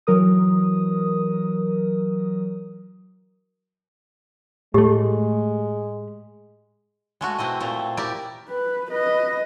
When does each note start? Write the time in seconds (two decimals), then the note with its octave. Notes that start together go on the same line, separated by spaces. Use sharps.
0.07 E3 F#3 A#4 D#6
4.74 A2 G#3 A3 G4
7.21 G#3 A3 F#4
7.38 B2 C4 E4 D#5
7.60 A#2 A3 C4
7.97 E4 G4 A#4 D5
8.49 B4
8.91 B4 D#5